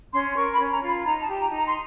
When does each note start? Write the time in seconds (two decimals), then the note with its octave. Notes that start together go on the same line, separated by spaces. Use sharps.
0.13 C#4 C6
0.36 A#4 C#6
0.53 B5
0.59 C#4
0.71 A#5
0.81 F4
0.88 B5
1.05 D#4 A#5
1.22 A5
1.28 G4
1.40 A#5
1.51 D#4
1.57 A#5
1.67 C6